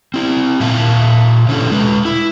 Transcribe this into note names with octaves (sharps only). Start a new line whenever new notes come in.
C4 E4
A#2 E5 F5 A5
B2 D3 C#4 E4 A4
G#3 B4
E4